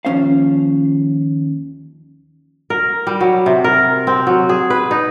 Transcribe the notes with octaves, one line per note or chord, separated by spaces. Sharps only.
D#2 F3 C#4 C5 F5
A#4
G3
F#3
C3
A#4
C4
F#3
G#4
B4
D#4